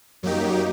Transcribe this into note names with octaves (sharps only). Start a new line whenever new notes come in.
F#2 F#3 A#3 D#4 G4